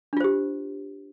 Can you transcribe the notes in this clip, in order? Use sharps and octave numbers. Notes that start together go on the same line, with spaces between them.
D4 F4 G4 C5